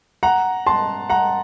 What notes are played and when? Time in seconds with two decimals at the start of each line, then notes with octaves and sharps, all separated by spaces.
0.23 F#5 A#5
0.66 A5 C6
1.10 F#5 A#5